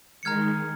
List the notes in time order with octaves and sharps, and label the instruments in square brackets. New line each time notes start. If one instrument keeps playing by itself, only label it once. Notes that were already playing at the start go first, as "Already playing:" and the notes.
[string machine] D#3 G#3 [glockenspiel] A#5 F6 G#6 C#7